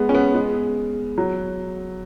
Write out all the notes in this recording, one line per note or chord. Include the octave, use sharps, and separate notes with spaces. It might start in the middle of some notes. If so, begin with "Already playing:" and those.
Already playing: G#3 B3
C#4
B3
G#3
F#3